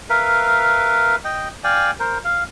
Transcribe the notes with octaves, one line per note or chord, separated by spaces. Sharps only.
A#4 B4 E5 F5
D#5 G5
D5 F5 G5 G#5
A#4 C5
F5